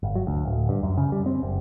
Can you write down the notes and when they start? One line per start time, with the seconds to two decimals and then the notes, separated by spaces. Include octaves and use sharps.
0.03 G1
0.15 F#3
0.27 D2
0.45 D1
0.69 G2
0.83 F#2
0.98 C#3
1.12 G3
1.26 C4
1.43 F#1